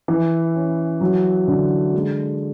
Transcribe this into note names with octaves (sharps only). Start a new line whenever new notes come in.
E3
C#4
F#3
D3
G#3